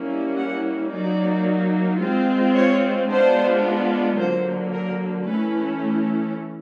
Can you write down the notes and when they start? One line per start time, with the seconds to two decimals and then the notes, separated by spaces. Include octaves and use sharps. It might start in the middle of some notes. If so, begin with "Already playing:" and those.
Already playing: G3 A#3 C#4 E4
0.36 F#5
0.90 F#3 A#3 D#4 D5
2.00 G#3 C4 F4
2.55 C#5
3.08 G#3 B3 D4 F4 C5
4.17 D3 F#3 A#3 C5
4.72 A#4
5.26 E3 A3 C#4 E4 B4